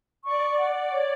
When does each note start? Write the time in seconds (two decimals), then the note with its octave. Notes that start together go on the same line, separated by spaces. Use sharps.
0.24 D5 C#6
0.58 F#5
0.91 C#5